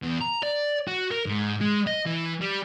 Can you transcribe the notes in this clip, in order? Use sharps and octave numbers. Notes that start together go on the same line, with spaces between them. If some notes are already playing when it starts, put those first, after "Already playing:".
E2
A#5
D5
F#4
A#4
G#2
G#3
D#5
E3
G3